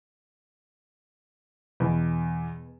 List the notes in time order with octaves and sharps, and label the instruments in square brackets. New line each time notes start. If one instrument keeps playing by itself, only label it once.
[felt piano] E2 [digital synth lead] B2